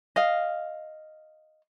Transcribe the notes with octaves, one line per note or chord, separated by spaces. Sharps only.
D#5 F5